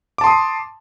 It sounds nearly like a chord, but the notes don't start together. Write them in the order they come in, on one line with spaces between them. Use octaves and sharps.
D6 A5 C6 D#6